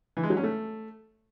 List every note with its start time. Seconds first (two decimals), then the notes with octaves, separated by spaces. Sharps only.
0.17 E3
0.23 G#3
0.30 F#3
0.37 C#4
0.43 A3